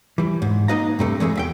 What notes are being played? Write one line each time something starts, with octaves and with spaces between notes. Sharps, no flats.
E3 G3
G#2
A#3 D#4 B4 D#5 F5 A#5
G2 C3 A3
E3 G#3 A3 G#4
E2 E5 G5